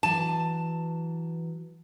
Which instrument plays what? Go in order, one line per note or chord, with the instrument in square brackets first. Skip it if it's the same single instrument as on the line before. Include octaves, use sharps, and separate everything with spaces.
[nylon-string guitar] E3 F#3 G#5 [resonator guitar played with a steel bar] A5